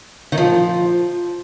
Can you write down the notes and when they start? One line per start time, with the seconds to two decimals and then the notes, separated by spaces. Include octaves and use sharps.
0.32 D#3
0.37 F3